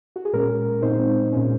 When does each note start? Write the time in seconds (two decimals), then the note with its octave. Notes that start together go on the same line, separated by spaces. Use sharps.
0.16 F#4
0.25 G#4
0.33 A#2 G#3 C#4 A#4
0.82 A#2 G#3 C4 D#4 C5
1.32 A#2 G#3 C#4